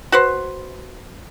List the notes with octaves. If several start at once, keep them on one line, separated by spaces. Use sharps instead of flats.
F#4 B4 C5